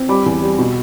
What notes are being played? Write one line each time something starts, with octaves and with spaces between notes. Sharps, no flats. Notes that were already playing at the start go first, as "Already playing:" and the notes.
Already playing: C4
G3 B5 D6
E2
G3
B2